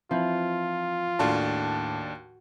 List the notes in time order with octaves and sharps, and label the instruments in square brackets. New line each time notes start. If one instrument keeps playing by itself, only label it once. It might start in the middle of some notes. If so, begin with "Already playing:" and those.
[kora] E3 F3 [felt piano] C4 [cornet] F4
[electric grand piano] D#2 D4 A5 [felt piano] A2 [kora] F#4